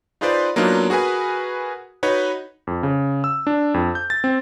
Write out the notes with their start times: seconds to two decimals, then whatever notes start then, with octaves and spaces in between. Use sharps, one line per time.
0.21 D#4 F4 G#4 B4 C5 D5
0.56 F#3 A#3 B3 D4 D#4 F4
0.90 F#4 G#4 A#4 B4 G#5
2.03 D#4 F#4 B4 C#5
2.67 F2
2.83 C#3
3.24 E6
3.47 D4
3.74 F2
3.95 G6
4.10 A6
4.24 C4